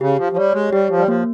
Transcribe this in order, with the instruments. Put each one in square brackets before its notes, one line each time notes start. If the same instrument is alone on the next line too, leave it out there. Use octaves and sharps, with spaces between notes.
[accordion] C#3 [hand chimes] G4
[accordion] F3
F3
[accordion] G3 [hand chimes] C#5
[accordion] G#3
[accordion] G3 [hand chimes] G4
[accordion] F3
G3
[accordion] F3 [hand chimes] A#3